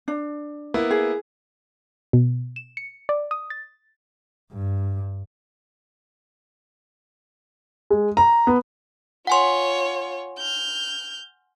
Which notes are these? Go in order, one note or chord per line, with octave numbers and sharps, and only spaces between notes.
D4
A#3 B3 E4
G#4
B2
E7
C#7
D5
D#6
A6
G2
G#3
A#5
B3
F4 C#5 F#5 G#5 C6
F6 G6